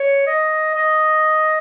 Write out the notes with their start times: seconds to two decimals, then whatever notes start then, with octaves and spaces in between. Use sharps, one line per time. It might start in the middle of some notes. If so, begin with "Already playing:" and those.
Already playing: C#5
0.27 D#5
0.74 D#5